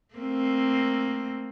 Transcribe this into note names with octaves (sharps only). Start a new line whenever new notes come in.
A3 A#3 C4